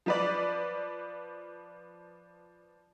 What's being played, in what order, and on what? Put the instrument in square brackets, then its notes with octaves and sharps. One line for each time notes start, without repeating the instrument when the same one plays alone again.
[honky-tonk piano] F3 B4 D5